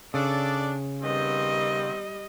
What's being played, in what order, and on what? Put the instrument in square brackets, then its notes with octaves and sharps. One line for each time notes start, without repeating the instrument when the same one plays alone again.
[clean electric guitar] C#3 [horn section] D4 A4 D5
[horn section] D#3 B3 C4 [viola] G3 D#5